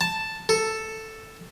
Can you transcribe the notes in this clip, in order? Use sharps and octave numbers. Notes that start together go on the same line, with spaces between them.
A5
A4